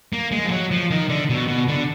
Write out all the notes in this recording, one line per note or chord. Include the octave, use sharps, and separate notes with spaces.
A#3
G#3
F3
F#3
F3
D#3
D3
B2
B2
D3